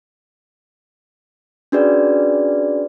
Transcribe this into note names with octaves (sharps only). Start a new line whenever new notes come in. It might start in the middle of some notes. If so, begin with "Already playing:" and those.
C#4 D4 F#4 G#4 B4 D5